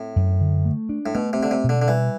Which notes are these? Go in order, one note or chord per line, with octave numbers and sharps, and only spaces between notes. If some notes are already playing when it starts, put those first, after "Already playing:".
Already playing: A2 C4
F#2
D3
A3
D4
A2
B2 A3
C3
D3 C4
C3
B2
D3
D3
E3 G3